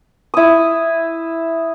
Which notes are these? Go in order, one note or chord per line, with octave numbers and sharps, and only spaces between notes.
E4 D#6